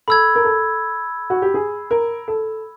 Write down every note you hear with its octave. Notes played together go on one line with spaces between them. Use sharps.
A4 B5 E6 G#6
A#4
A4
F#4
G4
G#4
A#4
A4